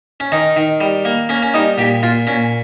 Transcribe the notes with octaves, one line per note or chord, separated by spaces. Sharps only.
C#4
D#3 D#4
D#3
G3
A#3
A#3 C#4
C#4
G3 D#4
A#2 G4
A#2 F4
A#2 C#4